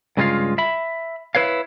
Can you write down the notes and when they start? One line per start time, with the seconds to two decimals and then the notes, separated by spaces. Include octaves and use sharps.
0.17 G2 C#3 G#3 A#3 F4 F5
0.58 E5 B5
1.35 E4 B4 C#5 F5